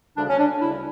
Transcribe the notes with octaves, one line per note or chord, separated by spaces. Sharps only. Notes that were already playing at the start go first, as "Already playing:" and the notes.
D2 C#3 G3 D4
C#4
D4
D2 C#3 G3 E4